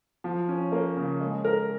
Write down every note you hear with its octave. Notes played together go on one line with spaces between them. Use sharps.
F3
C#4
A#3
C#3
G#3
A#4